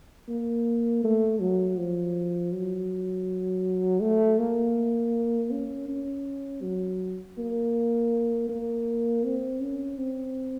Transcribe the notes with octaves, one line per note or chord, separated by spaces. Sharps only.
A#3
A3
F#3
F3
F#3
A3
A#3
C#4
C#4
F#3
A#3
A#3
C4
C#4
C4